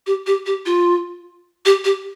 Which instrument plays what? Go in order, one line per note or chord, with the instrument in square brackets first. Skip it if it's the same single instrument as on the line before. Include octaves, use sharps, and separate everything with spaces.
[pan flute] G4
G4
G4
F4
G4
G4